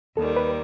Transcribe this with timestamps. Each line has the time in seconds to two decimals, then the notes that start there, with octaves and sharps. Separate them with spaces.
0.17 D#2 D#3 G3 A4
0.36 B4